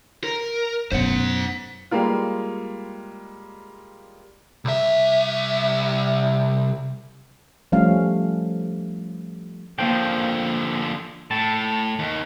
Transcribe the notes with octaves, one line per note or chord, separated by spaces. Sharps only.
A#4
F#2 B2 C5 F#5
G3 G#3 A#3 F4
C2 E5
F3 G3 A3 C#4 F5
D3 F3 A#3 C5 G5
A2 A5
D#2